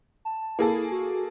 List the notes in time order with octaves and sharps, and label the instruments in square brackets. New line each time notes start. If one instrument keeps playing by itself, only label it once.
[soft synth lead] A5
[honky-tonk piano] A#3 G#4 A4 [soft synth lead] E4
[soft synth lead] F#4